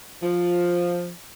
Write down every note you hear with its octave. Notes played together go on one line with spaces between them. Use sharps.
F3